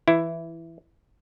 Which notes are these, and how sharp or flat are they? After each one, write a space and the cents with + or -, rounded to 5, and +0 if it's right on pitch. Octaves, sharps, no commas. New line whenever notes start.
E3 +0 E4 +10